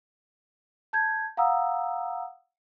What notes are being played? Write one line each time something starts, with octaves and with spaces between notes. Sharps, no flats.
A5 G6 G#6
F5 F#5 A#5 D#6 E6